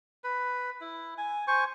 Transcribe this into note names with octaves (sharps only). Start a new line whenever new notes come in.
B4
E4
G#5
C5 G#5 C#6